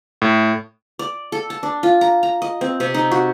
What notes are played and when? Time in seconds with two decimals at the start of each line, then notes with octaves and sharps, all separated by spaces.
0.22 A2
0.99 D5
1.32 A4
1.50 A5
1.63 D4
1.83 F4
2.01 A#5
2.23 A#5
2.42 D#5
2.61 C4
2.80 C3
2.94 D#4
3.11 F#4